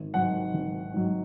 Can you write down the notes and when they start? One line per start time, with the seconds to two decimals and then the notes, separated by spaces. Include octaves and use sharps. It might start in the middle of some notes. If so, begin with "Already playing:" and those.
Already playing: G#1
0.14 G#2 F#3 F#5
0.54 G#1
0.94 G#2 F#3